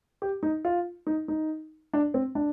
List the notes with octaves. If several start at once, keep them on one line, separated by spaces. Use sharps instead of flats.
G4
D#4
F4
D#4
D#4
D4
C4
D4